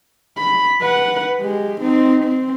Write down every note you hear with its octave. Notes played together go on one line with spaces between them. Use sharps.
B5
B4 F#5
G#3 G4
C4 D#4
C4